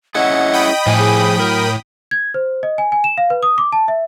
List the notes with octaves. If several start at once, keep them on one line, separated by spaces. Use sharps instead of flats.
C#4 E4 G#4 D#5 F#5
G5 B5 D#6
A2 F3 G3 G#5
G#4
F#3 A#4
G#6
C5
D#5
G#5
G#5
E7
F5
B4
D#6
D6
A5
E5